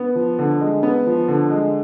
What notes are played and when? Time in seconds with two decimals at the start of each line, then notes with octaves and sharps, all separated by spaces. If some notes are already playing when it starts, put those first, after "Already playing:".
Already playing: B3
0.15 F3
0.39 D3
0.60 G#3
0.83 B3
1.06 F3
1.28 D3
1.50 G#3